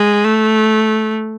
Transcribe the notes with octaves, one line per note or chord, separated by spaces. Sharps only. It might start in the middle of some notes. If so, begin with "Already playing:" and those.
Already playing: G#3
A3